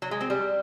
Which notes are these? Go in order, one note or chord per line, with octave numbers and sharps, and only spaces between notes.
F#3
G#3
C4
G3